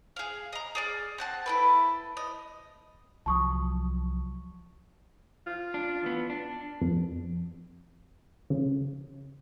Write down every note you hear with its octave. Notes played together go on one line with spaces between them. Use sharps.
G#4 F5
D#5 A#5
G#4 D5 F6
C4 F#5 A5
E4 A4 B4
D#5
C2 F3 F#3 A5 C#6 D#6
F4
D4
E3 B3
D4
F2
C#3